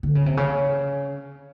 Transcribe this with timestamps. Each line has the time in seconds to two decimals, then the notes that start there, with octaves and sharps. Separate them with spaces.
0.03 D3
0.15 C#3
0.26 C3
0.37 C#3